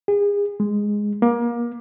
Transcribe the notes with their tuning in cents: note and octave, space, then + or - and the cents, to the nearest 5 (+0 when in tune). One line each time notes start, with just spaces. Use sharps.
G#4 -35
G#3 -5
A#3 +30